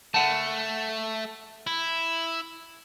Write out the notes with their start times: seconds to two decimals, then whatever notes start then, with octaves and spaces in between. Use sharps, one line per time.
0.14 A3 F#5 A5
1.67 E4